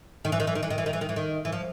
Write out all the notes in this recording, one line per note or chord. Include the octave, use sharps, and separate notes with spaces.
D#3
E3
D#3
E3
D#3
E3
D#3
E3
D#3
E3
D#3
E3
D#3
E3
F3